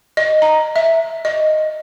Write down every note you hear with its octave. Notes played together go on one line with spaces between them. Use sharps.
D#5
A#5
E5
D#5